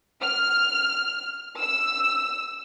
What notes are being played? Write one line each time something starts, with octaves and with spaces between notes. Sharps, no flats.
F6
E6